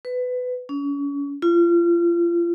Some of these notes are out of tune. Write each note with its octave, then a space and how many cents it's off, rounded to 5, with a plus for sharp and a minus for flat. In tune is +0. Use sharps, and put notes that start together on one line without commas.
B4 +20
C#4 +35
F4 -30